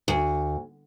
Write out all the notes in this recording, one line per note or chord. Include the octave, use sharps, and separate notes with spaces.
D2